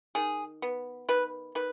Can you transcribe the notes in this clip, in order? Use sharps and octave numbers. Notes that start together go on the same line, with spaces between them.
D#3 G#4
B3
D#3 B4
D#3 B4